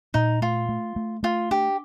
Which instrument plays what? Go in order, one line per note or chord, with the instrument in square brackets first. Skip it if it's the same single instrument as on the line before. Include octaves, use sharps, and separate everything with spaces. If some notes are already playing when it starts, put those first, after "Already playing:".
[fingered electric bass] A#2 [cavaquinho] D#4
[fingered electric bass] A3 [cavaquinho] F4
[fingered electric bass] A3
A3
[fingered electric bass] A3 [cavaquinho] F4
[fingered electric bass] D4 [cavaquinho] G4